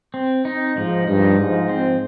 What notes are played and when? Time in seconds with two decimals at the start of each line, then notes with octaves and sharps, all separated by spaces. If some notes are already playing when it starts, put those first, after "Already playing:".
0.14 C4
0.45 D#4
0.76 G#2 F3
1.07 G2 D#4
1.39 G#2 F3
1.69 C4